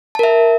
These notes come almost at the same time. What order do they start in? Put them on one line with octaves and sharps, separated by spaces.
A5 A#4 E5